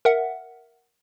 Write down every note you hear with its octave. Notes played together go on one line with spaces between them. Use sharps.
A#4 E5 F#5